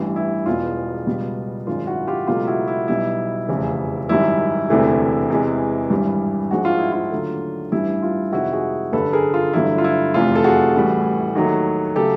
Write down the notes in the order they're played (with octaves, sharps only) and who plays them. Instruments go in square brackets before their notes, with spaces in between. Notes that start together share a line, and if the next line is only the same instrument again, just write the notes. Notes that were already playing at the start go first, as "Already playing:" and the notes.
Already playing: [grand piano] A1 G2 E3
E4
E1 E2 B2 F4
C#2 B2 G3
G#1 F#2 D#3 G#3 F4
E4 F#4
F4 G4
C#2 B2 F#3 A3 F4 G4
E4 F#4
E4
B1 B2 G3 E4
F1 E2 C#3 F3
G#1 F#2 D#3 G3 E4
E1 D2 C3 E3 A3
E2 C3 E3 G#3
G#1 G2 E3 G3
A#1 G#2 F3 G#3 F#4
F4
E4
F4
D#2 D3 F#3 A3
A1 G2 E3 G3 E4
F4
F2 C3 D#3 G#3 E4 F#4
F#4 G#4
G1 F#2 D3 G3 A4 B4
G#4 A#4
F4
G1 G2 D3 F#3 A3 E4
F4
E4
F1 E2 C3 F4
A4
F#4 G#4
A1 A2 E3 G3
D#2 D#3 F#3 A3
C#3 F#3 A3 G4 A4